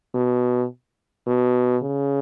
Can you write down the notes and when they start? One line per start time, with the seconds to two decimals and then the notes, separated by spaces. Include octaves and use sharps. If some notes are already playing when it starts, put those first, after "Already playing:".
0.14 B2
1.27 B2
1.83 C#3